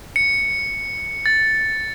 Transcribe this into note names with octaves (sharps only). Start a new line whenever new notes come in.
C#7
A6